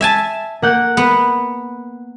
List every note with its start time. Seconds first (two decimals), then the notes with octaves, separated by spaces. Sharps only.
0.01 E5 G#5 A5
0.62 A#3 F#5 G6
0.97 B3